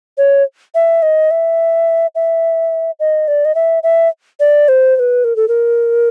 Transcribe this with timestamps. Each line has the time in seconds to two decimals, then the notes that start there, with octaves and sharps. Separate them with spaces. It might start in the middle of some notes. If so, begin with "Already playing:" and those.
0.18 C#5
0.75 E5
1.02 D#5
1.31 E5
2.15 E5
3.00 D#5
3.28 D5
3.45 D#5
3.55 E5
3.83 E5
4.40 D5
4.68 C5
4.96 C5
4.99 B4
5.24 A#4
5.36 A4
5.48 A#4